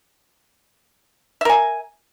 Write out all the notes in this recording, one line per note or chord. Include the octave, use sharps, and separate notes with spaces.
A#4 E5 G#5